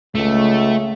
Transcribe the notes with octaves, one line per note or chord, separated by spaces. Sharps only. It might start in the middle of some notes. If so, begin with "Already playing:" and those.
C#2 A3